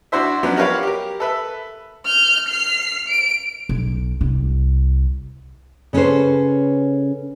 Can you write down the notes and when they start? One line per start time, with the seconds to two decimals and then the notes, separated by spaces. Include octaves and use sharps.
0.12 D4 E4 F#4 C5 E5
0.43 F3 F#3 B3 C#4 D4
0.57 F#4 G4 A#4 B4 C#5 F5
0.83 G4 A#4
1.20 A4 B4 E5
2.05 F6 G6
2.47 F6 C7
3.08 D7
3.69 B1
4.21 C2
5.93 C#3 C#4 A4 B4 C5